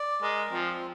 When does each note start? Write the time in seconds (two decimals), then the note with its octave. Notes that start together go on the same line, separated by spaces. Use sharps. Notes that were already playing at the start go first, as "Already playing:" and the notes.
Already playing: D5
0.22 G#3 A#4
0.51 F3 C4